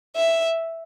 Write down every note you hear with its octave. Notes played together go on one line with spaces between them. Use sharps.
E5